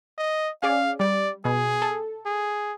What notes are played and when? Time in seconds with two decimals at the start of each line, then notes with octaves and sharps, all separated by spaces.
0.18 D#5
0.63 C#4 G#4 D5 F5
1.00 G3 D5
1.45 B2 G#4
1.82 A4
2.26 G#4